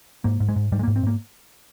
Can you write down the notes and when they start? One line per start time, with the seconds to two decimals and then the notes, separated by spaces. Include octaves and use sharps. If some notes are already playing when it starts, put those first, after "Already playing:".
0.24 G#2 A#3
0.40 G#2
0.49 G#3
0.56 G#2
0.72 G#2 G3
0.79 G#3
0.83 A#3
0.87 G#2
0.96 C4
1.03 G#2 A#3